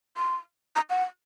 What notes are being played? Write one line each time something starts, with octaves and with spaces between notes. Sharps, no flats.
C6
A#5
F#5